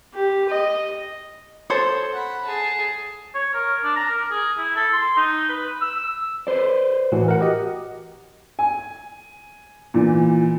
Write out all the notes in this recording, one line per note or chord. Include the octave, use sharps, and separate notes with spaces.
G4
D#5
A4 C5 C#5
F#5 B5
G#4 A5
C#5
A#4
D4
A#5
A#4
G#4
E4
A4
C6
D#4
B4
E6
B4 C5 D5
A2 E3 F#4
A#4 F#5
G4 D#5
G#5
A#2 E3